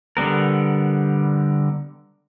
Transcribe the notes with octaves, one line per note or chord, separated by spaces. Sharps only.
D3 G3 B3 A#4